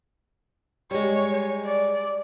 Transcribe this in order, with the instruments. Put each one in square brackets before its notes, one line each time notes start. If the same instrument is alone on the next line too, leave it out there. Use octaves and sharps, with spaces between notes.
[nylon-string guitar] G3 G#3 [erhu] C#5
[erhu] D5